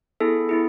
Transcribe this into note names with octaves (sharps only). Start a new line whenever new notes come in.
B3 E4 G#4 A4
B3 E4 G#4